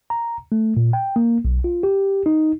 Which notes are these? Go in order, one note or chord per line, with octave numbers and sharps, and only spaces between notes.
A#5
A3
A#2
G5
A#3
B1
F4
G4
D#4